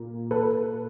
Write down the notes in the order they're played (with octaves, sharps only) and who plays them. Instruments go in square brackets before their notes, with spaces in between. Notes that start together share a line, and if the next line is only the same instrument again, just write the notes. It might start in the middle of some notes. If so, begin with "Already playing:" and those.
Already playing: [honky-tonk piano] A#2 A#3
A4 B4